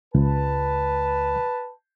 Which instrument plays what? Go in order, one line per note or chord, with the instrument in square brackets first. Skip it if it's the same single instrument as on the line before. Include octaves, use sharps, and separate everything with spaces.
[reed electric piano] C#2 [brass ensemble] B4 A5